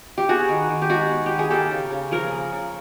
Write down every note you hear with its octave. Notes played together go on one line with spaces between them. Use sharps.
G4
B3 F#4 G#4
D#3
D#3
G4
G#3 F#4 G#4
B3
G4
D#3
G#4
A#3 G4 A4
C#3
C#3
F3 G#4 A#4
A#3
C#3